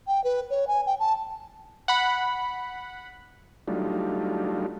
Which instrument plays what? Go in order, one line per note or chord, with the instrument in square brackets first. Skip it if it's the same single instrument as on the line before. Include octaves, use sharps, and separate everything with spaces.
[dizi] G5
B4
C#5
G#5
G5
A5
[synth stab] F#5 B5
[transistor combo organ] F#3 G3 A3 D4 D#4 F4